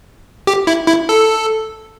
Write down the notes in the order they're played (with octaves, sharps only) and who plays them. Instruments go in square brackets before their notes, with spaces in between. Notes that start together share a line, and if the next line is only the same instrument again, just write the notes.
[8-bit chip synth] G4
E4
E4
A4